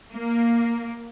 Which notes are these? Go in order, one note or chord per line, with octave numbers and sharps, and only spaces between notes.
A#3